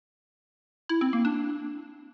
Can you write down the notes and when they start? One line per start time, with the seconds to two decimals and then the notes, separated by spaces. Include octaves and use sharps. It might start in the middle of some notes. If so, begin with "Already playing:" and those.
0.89 E4
1.01 C4
1.13 A#3
1.25 D4